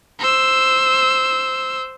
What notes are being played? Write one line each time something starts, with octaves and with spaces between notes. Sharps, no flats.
C5 E6